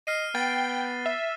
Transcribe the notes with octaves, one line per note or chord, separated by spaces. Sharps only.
D#5 F6 C7 D#7
B3 G5 A6
E5